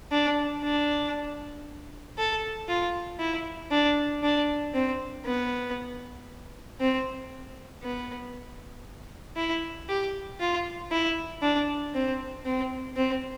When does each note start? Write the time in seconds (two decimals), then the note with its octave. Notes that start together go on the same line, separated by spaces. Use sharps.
0.11 D4
0.63 D4
2.18 A4
2.69 F4
3.19 E4
3.71 D4
4.23 D4
4.74 C4
5.25 B3
6.80 C4
7.82 B3
9.36 E4
9.89 G4
10.40 F4
10.91 E4
11.42 D4
11.95 C4
12.45 C4
12.96 C4